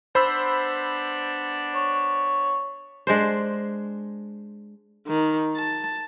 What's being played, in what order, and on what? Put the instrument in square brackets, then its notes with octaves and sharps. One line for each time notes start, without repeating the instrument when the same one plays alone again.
[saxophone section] B3 D4 [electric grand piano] C5 B5 E6
[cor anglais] C#5
[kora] G#3 D4 C5
[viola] D#3
A5